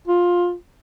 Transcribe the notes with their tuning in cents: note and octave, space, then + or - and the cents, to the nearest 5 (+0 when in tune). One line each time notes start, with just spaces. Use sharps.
F4 +15